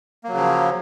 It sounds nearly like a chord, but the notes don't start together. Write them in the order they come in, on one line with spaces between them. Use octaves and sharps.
A#3 F#3 C#3 F3